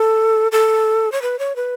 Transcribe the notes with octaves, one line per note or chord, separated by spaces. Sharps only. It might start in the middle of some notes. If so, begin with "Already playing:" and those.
Already playing: A4
A4
C#5
B4
C#5
B4